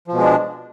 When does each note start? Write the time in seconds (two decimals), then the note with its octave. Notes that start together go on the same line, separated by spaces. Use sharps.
0.08 F3
0.13 B2
0.17 G#3
0.22 D4